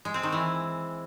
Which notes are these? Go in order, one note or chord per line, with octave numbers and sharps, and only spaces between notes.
G#3
C4
D#3
E3